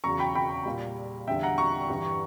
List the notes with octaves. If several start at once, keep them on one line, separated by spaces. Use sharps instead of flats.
E2 C#3 F#3 A#5 C#6
G5 B5
G5 B5
A#2 G3
E2 D3 G3 E5 G5
F#5 A#5
A#5 C#6
G2 E3 G3